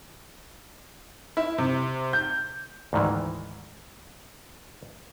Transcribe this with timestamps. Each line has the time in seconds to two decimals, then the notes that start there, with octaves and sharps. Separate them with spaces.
1.37 E4
1.58 C3
2.13 G6
2.93 D2 G#2 D#3 E3